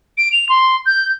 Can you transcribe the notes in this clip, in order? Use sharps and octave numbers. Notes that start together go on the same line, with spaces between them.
D7
F7
C6
G6